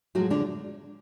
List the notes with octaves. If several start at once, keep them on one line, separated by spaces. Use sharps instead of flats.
A2 F3 F#3 G#3 F#4
D3 D4